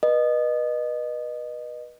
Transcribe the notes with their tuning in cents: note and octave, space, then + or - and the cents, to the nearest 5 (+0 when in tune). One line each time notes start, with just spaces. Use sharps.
B4 -25 D#5 -25